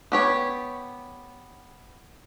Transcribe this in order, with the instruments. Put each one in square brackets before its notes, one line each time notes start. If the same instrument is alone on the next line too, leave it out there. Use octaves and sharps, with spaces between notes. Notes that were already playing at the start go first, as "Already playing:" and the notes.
[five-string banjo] B3 G4 C#5